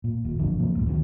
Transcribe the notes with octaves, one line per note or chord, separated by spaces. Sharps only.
A#2
D#1
G#1 G2 D3 F3
C3 F3 A#3
F#1 C#2 A2
D2 D#3 E3 C#4